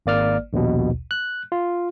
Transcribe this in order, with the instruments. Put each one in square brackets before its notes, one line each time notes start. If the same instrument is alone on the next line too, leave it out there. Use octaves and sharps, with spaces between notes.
[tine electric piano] G#1 A#3 D5 F6
A#1 D#2 B2
F#6
F4